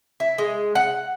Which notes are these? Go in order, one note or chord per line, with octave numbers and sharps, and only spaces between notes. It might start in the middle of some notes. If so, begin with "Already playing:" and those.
E4
G#3
F#5